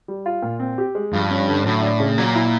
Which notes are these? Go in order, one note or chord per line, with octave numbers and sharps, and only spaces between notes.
G3
F4
A#2
C4
G4
G#3
G2 F3
C#4
D3
A2 F#3
D4
C#3
A#2 F#3
E4